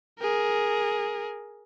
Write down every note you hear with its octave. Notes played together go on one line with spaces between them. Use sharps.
G#4 A#4